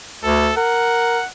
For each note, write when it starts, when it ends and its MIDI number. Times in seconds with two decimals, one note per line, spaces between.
0.24 0.51 38
0.24 0.55 69
0.57 1.20 70
0.57 1.28 78